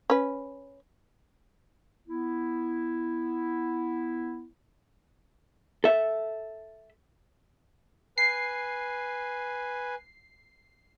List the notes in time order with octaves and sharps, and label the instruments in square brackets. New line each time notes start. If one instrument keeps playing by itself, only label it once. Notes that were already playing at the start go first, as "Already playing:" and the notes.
[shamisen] C#4 B4
[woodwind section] B3 E4
[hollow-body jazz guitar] A4 E5
[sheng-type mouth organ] B4 G#5 [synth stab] C7